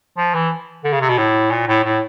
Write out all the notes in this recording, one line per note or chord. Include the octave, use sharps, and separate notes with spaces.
F3
E3
D3
C#3
C3
B2
A2
A#2
A2
A2